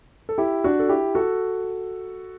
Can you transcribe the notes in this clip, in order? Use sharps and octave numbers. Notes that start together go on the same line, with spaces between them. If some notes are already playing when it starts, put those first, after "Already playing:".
A4
E4 G4
D4 F#4
A4
E4 G4
F#4 A4